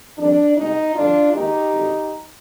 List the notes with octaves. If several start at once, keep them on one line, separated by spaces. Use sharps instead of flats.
F2 D#3 G3 C4 D4
C2 B2 G#3 B3 D#4
G1 F2 D3 F3 D4 F4
D#2 D#3 G#3 B3 D#4 G4
G#1 G2 D3